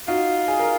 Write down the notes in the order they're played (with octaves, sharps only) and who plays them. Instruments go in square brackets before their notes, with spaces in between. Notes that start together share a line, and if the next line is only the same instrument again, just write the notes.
[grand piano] D#4 F#4 [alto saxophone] F4
[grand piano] G#4
A#4